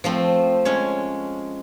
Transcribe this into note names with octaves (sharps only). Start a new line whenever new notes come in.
F3 A3 C4
G#3 C#4 C#5